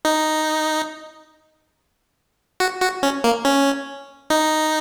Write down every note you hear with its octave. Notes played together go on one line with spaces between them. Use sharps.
D#4
F#4
F#4
C#4
A#3
C#4
D#4